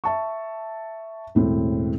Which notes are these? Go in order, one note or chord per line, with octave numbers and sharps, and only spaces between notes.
E5 A5 C#6
E1 A2 C4